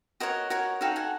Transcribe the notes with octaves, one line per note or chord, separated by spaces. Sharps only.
F#4 A#4 C#5 D#5
F#4 A#4 C#5
D#4 F#4 A4 F5 G5
F#5 G#5